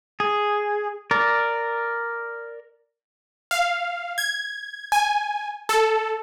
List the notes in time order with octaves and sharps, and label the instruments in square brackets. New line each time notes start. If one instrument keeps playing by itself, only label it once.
[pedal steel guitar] G#4
A#4 D5
[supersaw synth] F5
G#6
G#5
A4